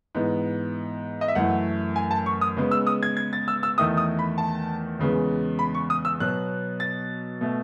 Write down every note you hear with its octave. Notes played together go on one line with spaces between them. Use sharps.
G#2 E3 B3
D#5
E5
F#2 E3 A3 F#5
G#5
A5
C#6
D#6
C#3 G#3 B3
E6
D#6
G#6
G#6
A6
E6
E6
E2 D#3 A3 D#6
D#6
B5
A5
E2 C#3 G#3 B3
B5
C#6
D#6
E6
B2 F#3 B3 F#6
A6
B2 A3